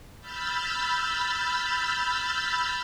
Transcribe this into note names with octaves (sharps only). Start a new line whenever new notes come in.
B5 E6 F6 G6 A6